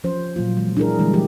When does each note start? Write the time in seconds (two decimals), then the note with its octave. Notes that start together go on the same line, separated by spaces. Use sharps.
0.04 F3 C#4 C5
0.36 A#2 F#3 A#3 F4
0.57 E3 G#3
0.77 D4 E4 G#4 A#4
0.99 D3 E3 G3 G#3 A#3 E4
1.13 E3 F3 G4